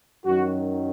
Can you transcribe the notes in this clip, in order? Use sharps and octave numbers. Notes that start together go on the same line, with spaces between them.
F#2 D#3 F#3 F#4